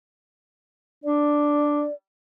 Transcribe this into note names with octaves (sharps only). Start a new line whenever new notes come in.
D4 D5